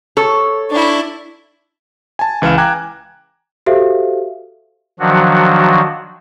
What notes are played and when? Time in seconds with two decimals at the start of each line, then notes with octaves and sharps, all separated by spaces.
0.17 A4 C#5
0.70 D4 E4
2.19 G#5 A5
2.42 C#2 E3 F5 F6 E7
2.58 G5 G#5 A#5 D6 F#6 G#6
3.66 F#4 G4 A4 C5 E5 F5
5.00 D#3 F3 F#3 D4 F#4